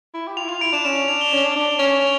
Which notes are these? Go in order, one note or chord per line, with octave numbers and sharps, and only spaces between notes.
E4
G4
F4 F7
E4
F4 F7
E4 D7
D4 E7
C#4 E7
F7
D4 F7
G7
C#4 G7
D4
D4
C#4 F7